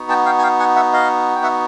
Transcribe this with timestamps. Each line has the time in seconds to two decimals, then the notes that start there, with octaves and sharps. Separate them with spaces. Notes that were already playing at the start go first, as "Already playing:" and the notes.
Already playing: B3 D#4 F#4
0.09 G5 A5
0.26 F5 G5
0.39 G#5
0.43 F5 G5
0.59 F#5 G#5
0.76 E5 F#5
0.93 D#5 F5
1.36 G5
1.43 E5 F#5